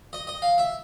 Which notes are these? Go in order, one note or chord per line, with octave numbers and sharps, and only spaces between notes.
D#5
D#5
F5
E5